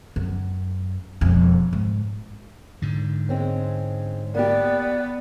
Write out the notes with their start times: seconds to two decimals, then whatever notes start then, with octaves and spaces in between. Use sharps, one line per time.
0.16 F#2
1.21 E1 F2
1.73 G#2
2.82 G#2 D3
3.29 G#3 C4 C#4
4.35 A#3 B3 G4 D5